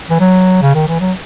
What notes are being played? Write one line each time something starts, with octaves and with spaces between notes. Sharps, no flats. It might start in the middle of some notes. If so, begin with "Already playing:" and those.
E3
F#3
C#3
D#3
E3
F#3